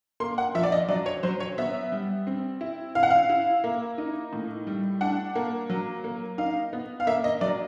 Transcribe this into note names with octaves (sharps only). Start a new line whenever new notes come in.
A#3 C6
F#5
F3 E5
D5
D#5
F#3 D5
C#5
F#3 C5
C#5
B3 E5
G3
C4
E4
E4 F5
F#5
F5
E4
A#3
D#4
A2
G3
D4 F#5
A#3
F#3
A#3
D#4 F5
B3
F5
A#3 E5
D#5
F#3 D5